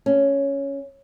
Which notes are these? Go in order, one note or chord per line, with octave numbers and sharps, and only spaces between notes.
C#4